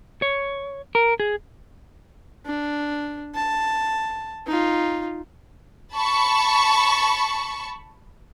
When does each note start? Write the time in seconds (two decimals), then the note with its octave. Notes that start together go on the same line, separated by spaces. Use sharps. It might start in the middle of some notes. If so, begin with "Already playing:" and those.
0.22 C#5
0.95 A#4
1.20 G#4
2.45 D4
3.35 A5
4.47 D#4 F4
5.94 A5 B5 C#6